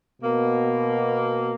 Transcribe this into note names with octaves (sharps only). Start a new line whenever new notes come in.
B2 A#3